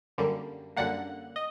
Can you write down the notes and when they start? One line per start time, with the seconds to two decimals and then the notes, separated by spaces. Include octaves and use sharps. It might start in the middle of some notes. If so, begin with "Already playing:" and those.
0.18 F#2 D3 G3 A#3
0.76 F#2 D3 G3 A#3 F#5
1.36 D#5